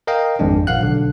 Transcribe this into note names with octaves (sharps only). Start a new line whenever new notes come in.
A#4 D#5 F5 G5
G#1 F2 G#3 D4
A#1 F5 F#5 F#6
B1 D3